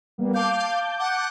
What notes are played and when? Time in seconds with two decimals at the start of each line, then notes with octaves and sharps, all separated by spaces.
0.18 G3 A#3 B3
0.34 F5 A5 D6 G6
0.99 F#5